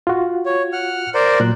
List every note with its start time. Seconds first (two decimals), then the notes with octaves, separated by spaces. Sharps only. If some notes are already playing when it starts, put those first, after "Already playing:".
0.07 F4 F#4
0.46 C#5
0.73 F#5 F6
1.14 A#4 C5 D5
1.40 A#2 F#3 F#6